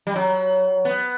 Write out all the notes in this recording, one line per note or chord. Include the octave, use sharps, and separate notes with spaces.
G3
F#3
B3